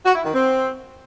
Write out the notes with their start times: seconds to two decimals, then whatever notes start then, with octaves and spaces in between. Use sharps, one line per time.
0.06 F#4
0.15 E4
0.25 D#3
0.34 C4